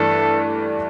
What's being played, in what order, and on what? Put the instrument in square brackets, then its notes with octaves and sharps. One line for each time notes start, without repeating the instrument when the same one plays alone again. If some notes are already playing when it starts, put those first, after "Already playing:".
Already playing: [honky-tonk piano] G2 E3 A3 D4 [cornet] A4